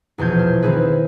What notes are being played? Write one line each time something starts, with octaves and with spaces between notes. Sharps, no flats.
A#1 E2 B2 G6 G#6
F6
D#3 C4 D#4 E4 G#4 B4